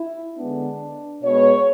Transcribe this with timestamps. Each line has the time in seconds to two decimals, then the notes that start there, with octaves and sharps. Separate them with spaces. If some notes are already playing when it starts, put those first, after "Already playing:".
Already playing: E4
0.38 D3 G#3 B3 D4
1.23 B2 G#3 B3 C#5